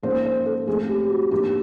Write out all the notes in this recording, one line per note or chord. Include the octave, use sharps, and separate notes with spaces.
G#2 F3 A#3 C#4 C5
C5
A4
G#2 F3 A3 C4 G#4
G4
F#4
G#2 F3 A#3 D4 G4